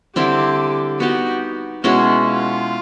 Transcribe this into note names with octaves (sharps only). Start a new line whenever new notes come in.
D3 G3 C4 E4 G4
B3 D#4 F#4 G4
B2 G#3 C#4 E4 F#4
F4